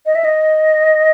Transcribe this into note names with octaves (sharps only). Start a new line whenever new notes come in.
D#5
E5
D#5